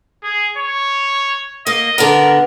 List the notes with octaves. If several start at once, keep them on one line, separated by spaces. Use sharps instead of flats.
G#4
C#5
A#3 D#5
D3 B3 A#4